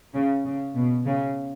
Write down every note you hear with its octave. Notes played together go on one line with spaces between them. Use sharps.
C#3
C#3
B2
C#3